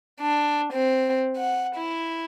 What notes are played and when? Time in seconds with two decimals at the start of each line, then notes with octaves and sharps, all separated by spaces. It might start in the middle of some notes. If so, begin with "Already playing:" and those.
0.20 D4
0.73 C4
1.37 F#5
1.75 E4